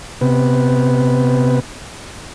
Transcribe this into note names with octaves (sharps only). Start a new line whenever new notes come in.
C3 B3